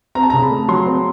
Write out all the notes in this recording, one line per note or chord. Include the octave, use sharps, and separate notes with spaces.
C4 A#5
A5
C#3 A#5
B5
A3
F#3 C6
C4